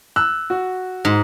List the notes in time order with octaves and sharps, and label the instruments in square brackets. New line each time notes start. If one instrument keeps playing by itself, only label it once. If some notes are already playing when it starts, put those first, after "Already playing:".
[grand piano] E6 F#6
F#4
[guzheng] G#2